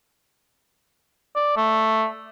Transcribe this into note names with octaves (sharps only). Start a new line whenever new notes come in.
D5
A3